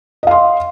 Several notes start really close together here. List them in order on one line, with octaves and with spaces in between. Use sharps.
D#5 F5 C6